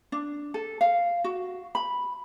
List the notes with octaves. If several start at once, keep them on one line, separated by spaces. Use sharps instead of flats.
D4
A4
F5
F#4
B5